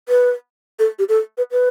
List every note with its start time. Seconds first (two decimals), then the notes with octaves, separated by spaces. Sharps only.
0.09 B4
0.79 A4
0.99 G4
1.09 A4
1.38 B4
1.52 B4